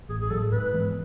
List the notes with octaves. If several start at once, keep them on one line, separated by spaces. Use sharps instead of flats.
A1 G#4
G#4
A2 F#3 A4
G#2 B4
E3 G#3 B3